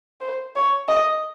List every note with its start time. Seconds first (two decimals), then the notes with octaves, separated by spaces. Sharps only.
0.21 C5
0.56 C#5
0.89 D#5